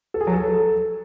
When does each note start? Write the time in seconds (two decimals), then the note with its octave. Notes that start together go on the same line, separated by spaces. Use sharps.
0.14 A4
0.21 G#4
0.27 F#3
0.33 A4